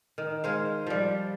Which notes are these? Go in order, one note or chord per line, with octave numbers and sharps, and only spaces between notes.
D#3
G#3 C5 F5
F3 G3